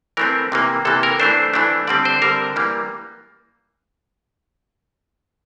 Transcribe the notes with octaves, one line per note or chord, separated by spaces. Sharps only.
E3 A3 C4 A#4
C3 E3 A#3
C3 E3 A#3 A4
A#4
E3 A3 D4 C5
E3 A3 D4
D3 G3 C4 D5
C5
D3 G3 C4 A#4
E3 G3 A#3